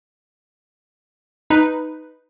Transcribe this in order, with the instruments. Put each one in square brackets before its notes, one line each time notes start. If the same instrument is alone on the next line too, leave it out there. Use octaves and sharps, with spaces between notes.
[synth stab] D#4 B4